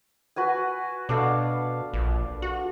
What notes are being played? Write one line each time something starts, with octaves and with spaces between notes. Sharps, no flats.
F#4 B4 G#5
B2 D4 A4 F5
A#1
F#4